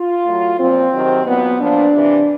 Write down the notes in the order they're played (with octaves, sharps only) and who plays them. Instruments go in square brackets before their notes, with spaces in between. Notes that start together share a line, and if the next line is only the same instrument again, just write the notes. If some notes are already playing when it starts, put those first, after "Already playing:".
Already playing: [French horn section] F4
A2 F#3
A#2 F3 C4
C3 D#3 F#3
A#2 F#3 B3
A#2 F3 D4
C3 E3